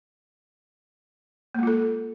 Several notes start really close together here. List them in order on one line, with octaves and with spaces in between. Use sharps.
A#3 G#3 F4 A4